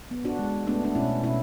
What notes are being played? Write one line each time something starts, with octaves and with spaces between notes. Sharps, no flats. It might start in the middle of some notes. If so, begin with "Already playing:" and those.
B3
D4 F#4
G#3
A3 B3 D4
D4
B2 C#4 E4
B2 C#4 E4